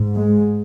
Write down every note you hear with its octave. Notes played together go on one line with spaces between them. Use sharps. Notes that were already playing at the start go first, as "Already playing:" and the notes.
Already playing: G#2
G#3